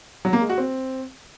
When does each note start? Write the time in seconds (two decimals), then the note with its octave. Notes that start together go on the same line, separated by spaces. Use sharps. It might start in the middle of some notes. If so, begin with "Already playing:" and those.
0.25 F#3
0.33 A#3
0.41 G#3
0.49 F#4
0.58 C4